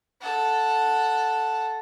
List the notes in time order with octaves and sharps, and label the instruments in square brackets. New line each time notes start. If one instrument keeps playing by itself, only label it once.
[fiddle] A4 F#5